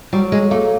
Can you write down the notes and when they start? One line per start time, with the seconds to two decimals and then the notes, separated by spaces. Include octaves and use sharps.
0.13 F#3 G3
0.32 G#3
0.51 A3 A#3